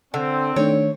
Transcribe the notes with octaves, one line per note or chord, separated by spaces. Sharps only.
D3 C4
D#3 A3 D4 C#5